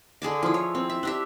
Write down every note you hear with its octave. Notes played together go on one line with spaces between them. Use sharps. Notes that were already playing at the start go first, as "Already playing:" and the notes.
D3 G#4 A5 D6
F3 E4
C#5
C4
E5
D4 G4 E5